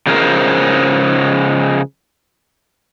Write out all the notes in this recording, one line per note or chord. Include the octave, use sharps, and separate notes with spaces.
C#3 F3 G#3 C#4 A#4 C5